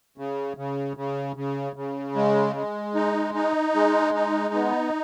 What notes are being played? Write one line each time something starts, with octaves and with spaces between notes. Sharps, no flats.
C#3
C#3
C#3
C#3
C#3
G#3
G#3
D#4
D#4
G#3
D#4
B3